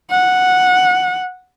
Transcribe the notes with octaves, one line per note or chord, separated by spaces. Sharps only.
F#5